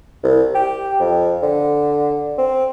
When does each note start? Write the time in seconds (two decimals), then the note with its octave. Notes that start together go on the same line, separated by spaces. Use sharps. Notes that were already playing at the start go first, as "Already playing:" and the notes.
0.24 C2
0.55 G4
1.00 F2
1.42 D3
2.38 C4